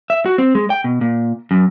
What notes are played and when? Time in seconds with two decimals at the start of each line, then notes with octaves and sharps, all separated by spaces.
0.10 E5
0.26 F#4
0.38 C4
0.55 G#3
0.70 G5
0.84 B2
1.01 A#2
1.51 F#2